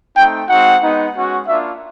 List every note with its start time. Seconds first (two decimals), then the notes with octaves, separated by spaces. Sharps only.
0.17 A3 C4 D#4 G5
0.49 G#3 C4 D#4 F#4 F#5
0.82 G#3 B3 D#4
1.15 G#3 C#4 F#4
1.48 A#3 D4 F4 E5